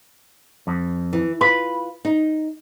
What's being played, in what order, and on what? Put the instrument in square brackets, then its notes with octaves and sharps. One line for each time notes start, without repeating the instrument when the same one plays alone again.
[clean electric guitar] F2
[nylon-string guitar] E3
[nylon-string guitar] F4 B4 [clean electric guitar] B5
[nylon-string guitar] D#4